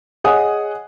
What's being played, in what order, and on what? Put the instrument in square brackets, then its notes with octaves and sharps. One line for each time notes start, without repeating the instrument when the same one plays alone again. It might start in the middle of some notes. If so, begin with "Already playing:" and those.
[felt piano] G#4 C#5 D#5 F#5 G#5 D#6